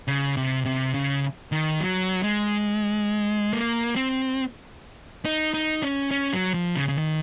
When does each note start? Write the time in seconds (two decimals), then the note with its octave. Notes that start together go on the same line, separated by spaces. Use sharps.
0.08 C#3
0.37 C3
0.65 C3
0.94 C#3
1.52 D#3
1.80 F#3
2.23 G#3
3.53 A#3
3.96 C4
5.25 D#4
5.54 D#4
5.82 C#4
6.11 C#4
6.33 F#3
6.54 F3
6.76 C#3
6.89 C#3
6.98 D#3